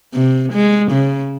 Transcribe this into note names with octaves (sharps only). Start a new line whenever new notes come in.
C3
G#3
C#3